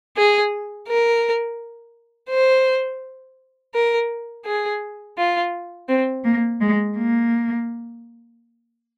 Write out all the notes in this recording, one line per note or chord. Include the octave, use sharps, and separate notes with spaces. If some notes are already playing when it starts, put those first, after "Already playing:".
G#4
A#4
C5
A#4
G#4
F4
C4
A#3
G#3
A#3